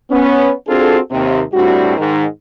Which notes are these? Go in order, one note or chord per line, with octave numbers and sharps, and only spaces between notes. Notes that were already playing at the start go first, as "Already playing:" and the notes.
B3 C#4
C4 D4 F4 F#4 G#4 A4
D#2 C3
A2 G3 C4 D4 F#4
G#2 D#3